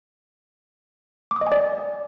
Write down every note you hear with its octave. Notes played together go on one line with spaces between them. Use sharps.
D6
D#6
D#5
G#5
D5